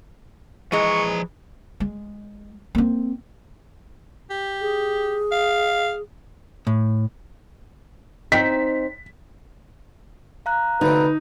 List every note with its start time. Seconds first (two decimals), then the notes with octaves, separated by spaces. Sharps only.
0.72 E3 F3 G#3 A#5 C#6
1.80 G#3
2.75 A#3 C4
4.30 G4
4.61 G#4
5.32 F5
6.67 A2
8.32 C4 D#4 B6
10.46 F5 A#5 F#6
10.81 D2 C3 D#4 B4